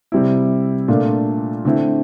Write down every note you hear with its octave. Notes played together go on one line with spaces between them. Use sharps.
C3 G3 C4 E4
A#2 A3 D4 F4
D3 A3 C4 E4